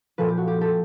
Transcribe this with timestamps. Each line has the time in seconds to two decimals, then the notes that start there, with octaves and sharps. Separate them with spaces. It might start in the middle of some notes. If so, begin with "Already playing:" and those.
0.18 A#2 F3 A4 B4
0.28 G4
0.37 F#4
0.47 G4
0.61 G4 A4